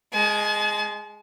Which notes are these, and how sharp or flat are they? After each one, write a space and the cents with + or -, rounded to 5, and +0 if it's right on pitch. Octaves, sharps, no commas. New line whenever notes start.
G#3 +0 A5 -45